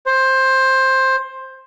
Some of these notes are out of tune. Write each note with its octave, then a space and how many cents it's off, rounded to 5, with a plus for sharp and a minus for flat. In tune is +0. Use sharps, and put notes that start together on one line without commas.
C5 +15